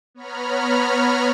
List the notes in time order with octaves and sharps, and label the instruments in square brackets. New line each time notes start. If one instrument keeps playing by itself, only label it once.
[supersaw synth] B3 C#5 A#5 B5 F6